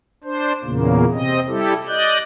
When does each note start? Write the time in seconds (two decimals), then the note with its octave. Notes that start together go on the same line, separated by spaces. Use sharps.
0.24 D4 C5
0.64 E2 A#2 C#3 A#3
1.13 C3 C4 D#5
1.48 G3 E4 G4 A4
1.88 D5 D#5 F#6 G6